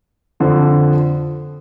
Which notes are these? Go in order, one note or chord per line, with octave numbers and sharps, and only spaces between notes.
F2 D3 F3